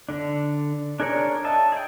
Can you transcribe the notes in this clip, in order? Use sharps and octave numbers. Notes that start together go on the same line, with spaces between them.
D3 D4
D4 G#4 A#4 C#5 D5
D#5 E5 A5
G#4 G5